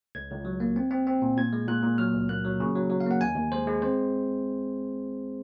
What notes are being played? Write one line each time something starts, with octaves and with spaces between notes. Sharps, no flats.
C#2 G#6
C#2
F#3
A#3
C4
C4
C4
A#2
A#2 G#6
G#3
A#2 F#6
A#2
F#3 F6
C#2
A#3 F#6
F#3
C#3
F#3
F#3
F5
A#3 F#5
D#2 G#5
D#2
G#3 C5
G#3
C4 C5